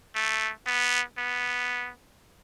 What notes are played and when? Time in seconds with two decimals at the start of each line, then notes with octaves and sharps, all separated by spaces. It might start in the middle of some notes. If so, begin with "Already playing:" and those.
0.15 A3
0.66 B3
1.18 B3